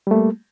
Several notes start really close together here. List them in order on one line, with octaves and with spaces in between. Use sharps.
G3 A3 A#3